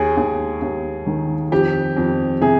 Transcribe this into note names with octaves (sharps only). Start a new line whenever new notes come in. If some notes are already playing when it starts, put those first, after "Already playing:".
Already playing: D#2 G#4
D#2
D#2
D#3
F2 G4
F2
C3 G#4